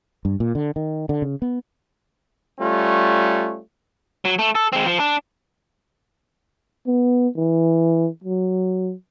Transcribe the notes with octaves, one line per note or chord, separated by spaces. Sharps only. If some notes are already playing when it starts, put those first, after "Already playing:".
G2
A#2
D3
D#3
D3
C#3
B3
G3 A3 C#4 F4
F#3
A3
A4
G#3 C4
F3
D4
B3
E3
F#3